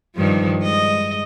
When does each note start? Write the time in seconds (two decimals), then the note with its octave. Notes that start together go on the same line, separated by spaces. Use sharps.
0.15 G2 D#3 F3
0.62 G#3 D#5